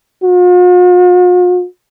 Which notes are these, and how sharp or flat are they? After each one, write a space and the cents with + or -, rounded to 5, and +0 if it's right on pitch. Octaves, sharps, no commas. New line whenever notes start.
F4 +45